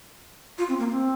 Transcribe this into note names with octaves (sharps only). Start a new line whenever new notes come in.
F4
C4
A#3
C4